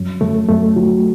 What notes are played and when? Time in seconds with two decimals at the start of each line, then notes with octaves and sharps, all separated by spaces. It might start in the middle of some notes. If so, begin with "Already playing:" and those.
Already playing: F#2
0.21 F#2 A3
0.49 F#2 A3
0.76 F#3